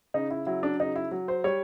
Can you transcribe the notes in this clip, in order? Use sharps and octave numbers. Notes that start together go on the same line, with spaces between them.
C#3 D#4
E4
F#3 E4
D4
C#3 D#4
E4
F#3
C5
G3 C#5